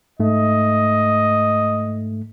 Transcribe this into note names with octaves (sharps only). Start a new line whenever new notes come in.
G#2 A3 D#5